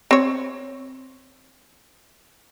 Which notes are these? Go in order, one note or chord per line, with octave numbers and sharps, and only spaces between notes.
C4 C#5